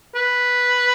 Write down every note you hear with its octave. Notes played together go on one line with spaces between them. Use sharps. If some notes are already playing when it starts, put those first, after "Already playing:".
B4